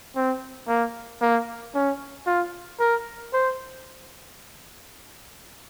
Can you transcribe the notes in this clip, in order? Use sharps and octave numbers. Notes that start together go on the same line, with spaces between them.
C4
A#3
A#3
C#4
F4
A#4
C5